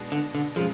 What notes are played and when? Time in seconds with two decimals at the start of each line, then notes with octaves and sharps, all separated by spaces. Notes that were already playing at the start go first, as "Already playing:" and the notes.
Already playing: B2 G#3 D4
0.12 D3
0.35 D3
0.56 C#3 F3 G#3